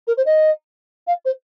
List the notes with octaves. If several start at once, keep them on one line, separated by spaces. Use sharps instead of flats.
A#4
C5
D#5
F5
C5